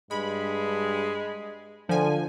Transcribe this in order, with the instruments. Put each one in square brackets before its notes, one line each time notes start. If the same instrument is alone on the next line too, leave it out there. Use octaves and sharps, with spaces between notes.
[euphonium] G2 [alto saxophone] G#3 [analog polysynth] B5
[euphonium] D3 [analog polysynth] F3 G#5